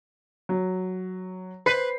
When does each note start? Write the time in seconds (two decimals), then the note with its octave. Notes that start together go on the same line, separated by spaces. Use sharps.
0.49 F#3
1.66 B4 C5 B6 C7